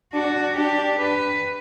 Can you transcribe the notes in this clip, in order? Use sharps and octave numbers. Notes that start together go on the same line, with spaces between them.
D4 F#4
D4 G4
B4